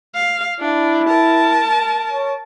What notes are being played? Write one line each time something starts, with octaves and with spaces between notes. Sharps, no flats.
F5
D4 E4
A#4 A5
C#5